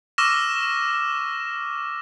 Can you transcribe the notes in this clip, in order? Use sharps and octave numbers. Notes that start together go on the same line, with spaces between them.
C#6 D6 E6 F6 A#6 E7